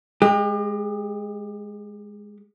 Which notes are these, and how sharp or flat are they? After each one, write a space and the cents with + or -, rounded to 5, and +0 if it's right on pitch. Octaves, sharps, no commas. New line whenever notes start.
G#3 +0 G4 +35